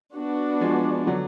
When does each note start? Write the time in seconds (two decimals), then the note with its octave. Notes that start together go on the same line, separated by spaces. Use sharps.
0.15 B3 D4 F#4
0.61 F3 G#3
1.07 D3 F#3